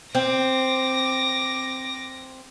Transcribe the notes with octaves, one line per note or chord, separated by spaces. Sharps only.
C4 D6 A#6